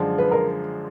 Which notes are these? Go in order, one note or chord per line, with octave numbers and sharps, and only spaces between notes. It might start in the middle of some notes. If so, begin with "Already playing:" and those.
Already playing: F#2 D3 F3 G#3
B4
A#4